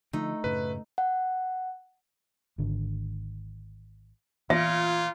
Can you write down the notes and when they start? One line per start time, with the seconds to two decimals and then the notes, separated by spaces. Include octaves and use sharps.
0.13 D3 F3 A3 D#4
0.44 F#2 A2 C#3 B4
0.98 F#5
2.58 G#1 D3
4.50 A#2 E3 B3 F4 E5